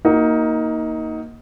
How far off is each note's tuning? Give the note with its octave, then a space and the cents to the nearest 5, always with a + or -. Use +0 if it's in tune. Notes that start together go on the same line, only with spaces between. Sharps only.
A#3 +0 D#4 +20 F#4 +0